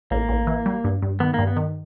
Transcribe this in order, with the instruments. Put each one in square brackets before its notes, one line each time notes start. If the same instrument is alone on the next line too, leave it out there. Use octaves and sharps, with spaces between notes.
[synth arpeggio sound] A1 [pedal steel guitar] A#3
[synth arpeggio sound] A1
E3
G3
G2
G2
[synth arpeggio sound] D#3 [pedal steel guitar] B3
[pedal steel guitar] A#3
[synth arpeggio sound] G2
[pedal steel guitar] B3
[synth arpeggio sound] D#3